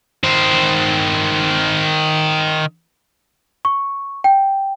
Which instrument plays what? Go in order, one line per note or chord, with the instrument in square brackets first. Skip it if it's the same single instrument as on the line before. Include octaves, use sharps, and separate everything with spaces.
[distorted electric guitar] D#3 C5
[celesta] C#6
G5